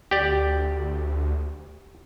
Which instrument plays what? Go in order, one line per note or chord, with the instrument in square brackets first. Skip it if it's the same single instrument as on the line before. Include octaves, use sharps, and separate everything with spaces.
[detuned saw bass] D2 [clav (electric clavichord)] G4 D5